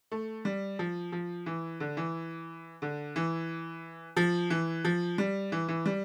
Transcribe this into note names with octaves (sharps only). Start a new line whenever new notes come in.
A3
G3
F3
F3
E3
D3
E3
D3
E3
F3
E3
F3
G3
E3
E3
G3